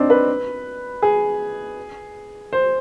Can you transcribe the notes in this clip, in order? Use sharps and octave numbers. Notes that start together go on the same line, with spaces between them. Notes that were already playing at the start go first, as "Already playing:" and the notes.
Already playing: C4 D4 D#4
B4
G#4
C5